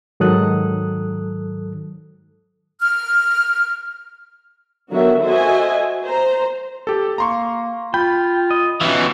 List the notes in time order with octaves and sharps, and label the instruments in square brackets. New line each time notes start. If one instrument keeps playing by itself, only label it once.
[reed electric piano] G#2 D#3 F#3 A4 D#6 F#6
[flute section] F6
[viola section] D3 D#3 F#3 B3 F#4 E5
F#4 A4 C5 D#5 E5 G#5
C5 A#5
[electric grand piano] G4 A4
[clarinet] A#3 [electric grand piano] A#5 C6 C#6
[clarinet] F4 [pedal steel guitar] G5 [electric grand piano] B5
[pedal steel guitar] D#5
[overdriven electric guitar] B2 E3 [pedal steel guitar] C#4 D#4 F4